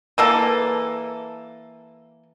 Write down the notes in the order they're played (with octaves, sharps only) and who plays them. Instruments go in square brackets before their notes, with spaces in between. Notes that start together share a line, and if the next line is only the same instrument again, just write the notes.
[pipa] E3 A#3 A4